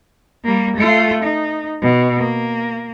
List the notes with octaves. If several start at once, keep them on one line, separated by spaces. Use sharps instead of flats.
G3 A#3
A3 F4
D#4
B2
A#3